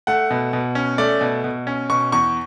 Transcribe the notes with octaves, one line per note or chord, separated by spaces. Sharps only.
A3 F#5
B2
B2
C#4
A3 D5
B2
B2
C#4
B2 C#6
E2 C#6